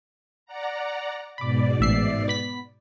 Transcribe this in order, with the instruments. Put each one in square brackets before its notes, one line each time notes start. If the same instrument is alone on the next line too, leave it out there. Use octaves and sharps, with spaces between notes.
[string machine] D5 F#5 A#5
[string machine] G#2 B2 D5 [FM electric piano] B5 D6
[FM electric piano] A1 E5 C7
B3 B5 B6